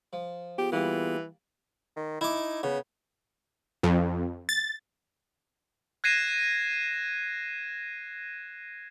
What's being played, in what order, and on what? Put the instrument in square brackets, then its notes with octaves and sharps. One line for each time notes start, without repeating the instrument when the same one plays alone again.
[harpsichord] F3
[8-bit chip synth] B3 F4 G#4 [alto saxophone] G4
[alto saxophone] E3 [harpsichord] G3 A#3
[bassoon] D#3
[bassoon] D#4 [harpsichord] E4 D6
[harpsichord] C#3 [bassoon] B3
[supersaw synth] F2
A6
[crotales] F#6 G#6 A#6 C7 D#7 E7